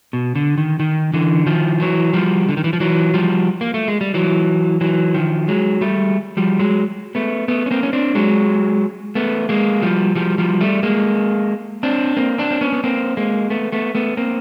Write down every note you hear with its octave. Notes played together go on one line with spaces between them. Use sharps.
B2
D3
D#3
D#3
D3 E3
D#3 F3
E3 F#3
F3 G3
D3
D#3
E3
F3
E3 F#3
F3 G3
A#3
A3
G#3
G3
E3 F#3
E3 F#3
D#3 F3
F#3 G#3
G3 A3
F3 G3
F#3 G#3
A3 B3
A3 B3
C#4
A#3 C4
C#4
C4 D4
F#3 G#3
A3 B3
G#3 A#3
F3 G3
F3 G3
F3 G3
G3 A3
G#3 A#3
C4 D4
A#3 C4
C4 D4
C4
B3 C#4
B3
A#3 C4
G#3 A#3
A3 B3
A3 B3
A3 B3
A#3 C4